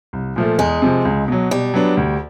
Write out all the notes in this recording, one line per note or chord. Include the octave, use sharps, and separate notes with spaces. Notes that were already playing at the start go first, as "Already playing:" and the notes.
C2
A#2 F3 A3
E2 G#3
C3 F3
C#2
B2 F#3
B2 G3
F#3 B3 D4
D2